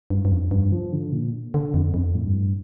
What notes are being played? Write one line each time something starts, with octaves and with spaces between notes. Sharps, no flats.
G2
G2
F2
G2
F3
D3
A#2
D3
F2
F2
A2
G2